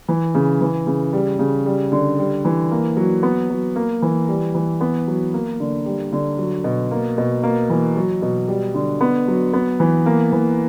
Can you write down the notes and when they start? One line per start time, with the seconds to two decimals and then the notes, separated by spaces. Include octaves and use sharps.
0.09 E3
0.35 C#3
0.61 E3
0.87 C#3
1.13 G3
1.39 C#3
1.66 G3
1.92 D3
2.18 G3
2.45 E3
2.71 A#3
2.97 F#3
3.23 B3
3.50 F#3
3.76 A#3
4.02 E3
4.28 G3
4.55 E3
4.81 B3
5.07 F#3
5.34 A#3
5.60 D3
5.86 G3
6.13 D3
6.38 F#3
6.64 B2
6.91 A#3
7.18 B2
7.43 A#3
7.70 E3
7.96 F#3
8.22 B2
8.48 G3
8.74 D3
9.01 B3
9.28 F#3
9.53 B3
9.80 E3
10.06 A#3
10.32 E3